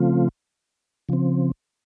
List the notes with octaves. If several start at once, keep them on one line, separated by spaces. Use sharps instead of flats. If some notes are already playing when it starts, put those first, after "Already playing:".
Already playing: C#3 F3 A3 C4 F4
C#3 F3 C4